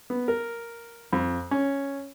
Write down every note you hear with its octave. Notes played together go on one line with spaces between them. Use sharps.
B3
A#4
F2
C#4